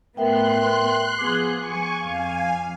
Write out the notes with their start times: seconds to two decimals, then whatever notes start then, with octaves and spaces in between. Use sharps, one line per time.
0.17 A2 B3 A#4 E5 G5 C6 F#6
1.19 F3 B3 G#4 D6
1.58 G#5 C#6
2.05 F2 F5 G#5